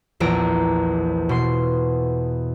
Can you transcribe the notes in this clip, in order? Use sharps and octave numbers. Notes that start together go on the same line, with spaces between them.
A#1 E2 A#5 D7
B2 C6